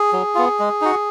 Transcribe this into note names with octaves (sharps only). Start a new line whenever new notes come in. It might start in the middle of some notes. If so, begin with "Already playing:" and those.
Already playing: G#4
F#3
B3 F4
G#3
D#4 F#4